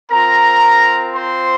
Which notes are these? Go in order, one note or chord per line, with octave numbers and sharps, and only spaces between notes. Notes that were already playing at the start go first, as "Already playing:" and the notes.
C4 F4 A#4 A#5
C5 C6